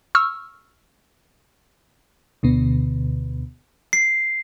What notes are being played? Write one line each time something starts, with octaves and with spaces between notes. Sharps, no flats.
C#6 E6 F6
D2 B2 D3 B3
C7